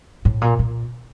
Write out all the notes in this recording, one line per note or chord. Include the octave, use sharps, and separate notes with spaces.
A2
A#2
A#2